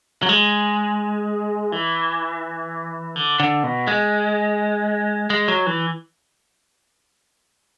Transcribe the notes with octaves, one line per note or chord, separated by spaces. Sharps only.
F#3
G#3
E3
D3
D3
B2
G#3
G#3
F#3
E3